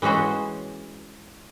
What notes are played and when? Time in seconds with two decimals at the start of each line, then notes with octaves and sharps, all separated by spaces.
0.02 E3 G#3 C#4 F#4 C5